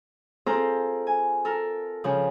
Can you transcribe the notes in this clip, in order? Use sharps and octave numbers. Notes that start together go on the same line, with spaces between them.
C4 F4 G#4 A4 C5 A#5
G#5
A4 A#4
C#3 F3